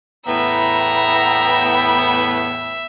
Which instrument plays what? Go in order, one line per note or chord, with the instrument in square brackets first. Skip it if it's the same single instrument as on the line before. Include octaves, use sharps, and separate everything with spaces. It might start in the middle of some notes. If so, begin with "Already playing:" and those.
[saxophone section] E2 A2 B3 [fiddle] E5 [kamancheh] G5 B5 [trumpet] A#5